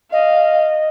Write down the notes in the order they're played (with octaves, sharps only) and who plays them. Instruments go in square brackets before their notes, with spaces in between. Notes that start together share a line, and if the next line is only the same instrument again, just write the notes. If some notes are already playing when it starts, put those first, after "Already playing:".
[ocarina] D#5 [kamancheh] F5